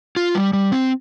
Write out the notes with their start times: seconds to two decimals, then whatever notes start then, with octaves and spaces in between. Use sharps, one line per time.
0.16 F4
0.35 G3
0.53 G3
0.72 C4